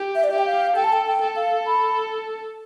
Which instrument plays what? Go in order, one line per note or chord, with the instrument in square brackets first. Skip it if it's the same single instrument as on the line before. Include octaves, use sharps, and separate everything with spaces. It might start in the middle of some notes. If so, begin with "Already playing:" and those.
Already playing: [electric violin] G4
[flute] E5
D5
[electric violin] G4 [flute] E5
[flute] G5
F5
[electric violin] A4 [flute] G5
[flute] A5
G5
G5
[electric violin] A4
[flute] F5
B5